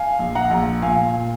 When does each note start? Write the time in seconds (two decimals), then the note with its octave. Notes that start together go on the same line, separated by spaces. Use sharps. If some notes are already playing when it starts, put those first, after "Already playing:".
Already playing: F5 G#5
0.19 A#1
0.35 F#5 A#5
0.51 A#1
0.82 A#2 F5 G#5
1.13 A#2